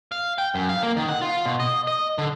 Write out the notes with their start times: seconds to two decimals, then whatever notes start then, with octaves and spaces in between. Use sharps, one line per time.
0.12 F5
0.38 G5
0.55 F#2
0.69 F5
0.83 A#3
0.97 D#3
1.09 F#5
1.21 F4
1.46 B2
1.60 D#5
1.87 D#5
2.18 D3